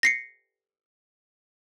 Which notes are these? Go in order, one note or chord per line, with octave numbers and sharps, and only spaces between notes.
A#6 C7 C#7